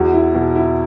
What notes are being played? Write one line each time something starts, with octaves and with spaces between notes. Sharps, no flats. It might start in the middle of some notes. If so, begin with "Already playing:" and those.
Already playing: E2 F#4
E4
B2
E4